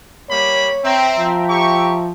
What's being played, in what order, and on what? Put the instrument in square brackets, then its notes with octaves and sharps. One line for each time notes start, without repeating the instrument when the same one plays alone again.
[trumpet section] G3 A#3 B5 [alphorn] C#5
[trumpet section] C4 [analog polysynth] E5 G5 A#5
[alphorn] F3
[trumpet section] G4 C#6